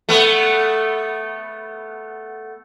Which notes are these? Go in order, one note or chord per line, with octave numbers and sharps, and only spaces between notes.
A3 B3